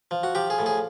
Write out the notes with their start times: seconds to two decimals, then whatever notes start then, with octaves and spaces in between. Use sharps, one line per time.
0.11 F3
0.23 F#4
0.35 F3 G4
0.50 G#4
0.59 A2
0.66 G#4